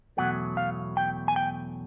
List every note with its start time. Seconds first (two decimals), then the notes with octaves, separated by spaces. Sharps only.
0.17 E2 B2 F#3 A3 F#5
0.57 F5
0.97 G5
1.28 G#5
1.36 G5